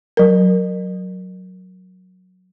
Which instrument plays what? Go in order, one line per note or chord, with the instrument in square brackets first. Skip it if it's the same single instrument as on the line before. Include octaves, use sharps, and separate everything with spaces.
[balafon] F#3 A#4